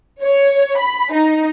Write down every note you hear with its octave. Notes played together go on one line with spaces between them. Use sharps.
C#5
B5
D#4